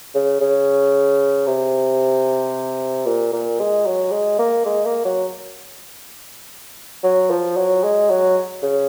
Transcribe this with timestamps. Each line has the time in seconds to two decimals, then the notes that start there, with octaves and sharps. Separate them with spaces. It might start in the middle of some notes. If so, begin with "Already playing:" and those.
0.15 C#3
0.41 C#3
1.47 C3
3.06 A#2
3.32 A#2
3.60 G#3
3.86 F#3
4.12 G#3
4.39 A#3
4.65 G#3
4.85 A#3
5.05 F#3
7.03 F#3
7.31 F3
7.57 F#3
7.84 G#3
8.10 F#3
8.63 C#3